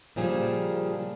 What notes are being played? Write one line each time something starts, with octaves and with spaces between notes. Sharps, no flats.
A#2 C#3 F3 G3 D4 G#4